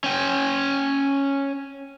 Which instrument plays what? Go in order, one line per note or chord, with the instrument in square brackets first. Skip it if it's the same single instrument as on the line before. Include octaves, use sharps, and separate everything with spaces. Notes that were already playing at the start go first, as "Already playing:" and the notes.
[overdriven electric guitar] C#4 G5